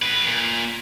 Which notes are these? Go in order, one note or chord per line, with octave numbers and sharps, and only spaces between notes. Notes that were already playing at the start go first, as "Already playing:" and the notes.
A2 B4
A#2